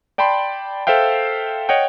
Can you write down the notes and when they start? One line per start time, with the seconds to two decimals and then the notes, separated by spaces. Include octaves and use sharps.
0.18 D5 G5 A5 B5 C6
0.87 A4 C5 E5 F5 G5
1.69 C#5 D#5 F#5 G5